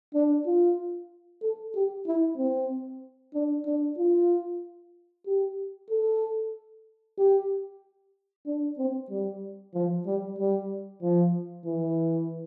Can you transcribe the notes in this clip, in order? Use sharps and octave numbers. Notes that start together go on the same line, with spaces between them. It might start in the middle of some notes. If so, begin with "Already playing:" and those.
D4
F4
A4
G4
E4
C4
D4
D4
F4
G4
A4
G4
D4
C4
G3
F3
G3
G3
F3
E3